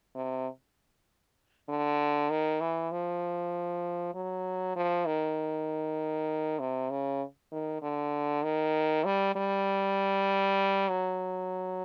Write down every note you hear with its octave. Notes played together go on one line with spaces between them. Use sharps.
C3
D3
D#3
E3
F3
F#3
F3
D#3
C3
C#3
D#3
D3
D#3
G3
G3
F#3